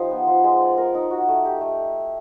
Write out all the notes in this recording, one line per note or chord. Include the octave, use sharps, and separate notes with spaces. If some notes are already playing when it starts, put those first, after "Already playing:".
Already playing: F3 D#4 G4
B3
F3
G#3
D5
A#4
D#4
F#4
A3
G4
A3